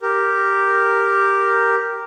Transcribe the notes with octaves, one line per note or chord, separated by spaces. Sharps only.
G4 A#4